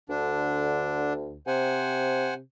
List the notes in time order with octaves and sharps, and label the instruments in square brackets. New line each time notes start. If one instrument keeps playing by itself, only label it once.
[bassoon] D2 [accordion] D3 D4
[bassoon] C3 [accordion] C5 F#5 G#5